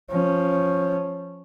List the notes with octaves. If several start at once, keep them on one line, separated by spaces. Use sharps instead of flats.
F3 C#4